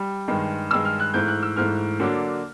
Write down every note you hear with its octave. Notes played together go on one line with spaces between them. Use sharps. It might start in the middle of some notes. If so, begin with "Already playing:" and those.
Already playing: G3
G2 D#3 G#3
G2 D#3 G#3 E6
F6
F#6
G#2 E3 A3 G6
F#6
E6
G#2 E3 A3 F6
D3 F#3 A#3 D4